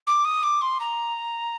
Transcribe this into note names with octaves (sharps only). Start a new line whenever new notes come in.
D6
D#6
D6
C6
A#5